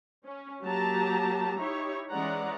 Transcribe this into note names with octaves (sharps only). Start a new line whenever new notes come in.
C#4
F#3 A#3 G4 A5 A#5
D#4 E4 G4 C#5
E3 G#3 C#4 D5 F#5 A#5